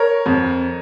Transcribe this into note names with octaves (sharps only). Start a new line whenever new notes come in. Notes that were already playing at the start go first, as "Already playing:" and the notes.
Already playing: A#4 C#5
F2